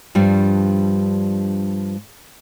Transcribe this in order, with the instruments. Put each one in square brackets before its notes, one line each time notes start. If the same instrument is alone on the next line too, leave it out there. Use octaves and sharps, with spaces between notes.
[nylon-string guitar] G2 F3 G3 D4